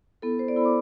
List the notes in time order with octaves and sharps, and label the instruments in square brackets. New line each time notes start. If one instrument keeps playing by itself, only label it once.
[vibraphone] B3 E4 A4
C5
D5
E4 B5
B3 D6